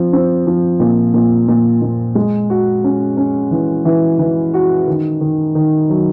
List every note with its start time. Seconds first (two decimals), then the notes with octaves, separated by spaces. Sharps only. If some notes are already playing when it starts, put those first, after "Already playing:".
Already playing: F3 C4
0.13 C4
0.47 F3
0.80 A#2
1.14 A#2
1.48 A#2
1.82 A#2
2.15 G#3
2.50 F#4
2.84 C#4
3.17 C#4
3.51 E3
3.85 E3
4.19 E3
4.54 F#4
4.87 D#3
5.21 D#3
5.55 D#3
5.90 F#3